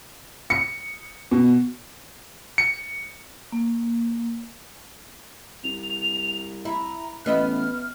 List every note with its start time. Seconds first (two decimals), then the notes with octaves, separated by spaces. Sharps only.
0.50 C#7
1.31 B2
2.58 C#7
3.52 A#3
5.64 C2 F7
6.65 E4 A#5
7.26 A1 B3 D#5 E5 F6